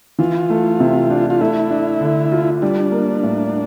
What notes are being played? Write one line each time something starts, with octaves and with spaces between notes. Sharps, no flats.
E3 F4
A3
C3
D4
F4
A3 E4
D4
D3
F4
G3 D4
A#3
A2